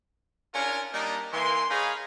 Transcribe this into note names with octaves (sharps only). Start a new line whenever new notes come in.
C#4 D4 E4 F4 G#4 A#4
G3 A#3 D4 D#4
E3 A#3 G#5 C6
D#4 G#4 C#5 F5 G#5 B5